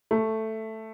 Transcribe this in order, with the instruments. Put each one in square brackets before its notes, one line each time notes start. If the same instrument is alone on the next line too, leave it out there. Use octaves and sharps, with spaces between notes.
[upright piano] A3